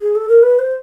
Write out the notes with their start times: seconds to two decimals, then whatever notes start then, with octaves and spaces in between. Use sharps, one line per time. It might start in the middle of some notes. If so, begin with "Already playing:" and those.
0.01 G#4
0.15 A4
0.29 A#4
0.43 B4
0.59 C5